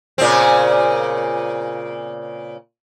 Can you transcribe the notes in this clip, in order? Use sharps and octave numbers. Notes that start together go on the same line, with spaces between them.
A#2 C#3 C4